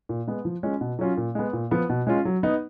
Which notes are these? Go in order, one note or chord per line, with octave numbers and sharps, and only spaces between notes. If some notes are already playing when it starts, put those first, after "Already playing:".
A#2
G#3 B3
F3
G#3 C#4 F4
B2
F#3 C#4 F4
A#2
G#3 B3
A#2
F3 B3 F4
B2
G#3 C#4 F4
F#3
B3 D#4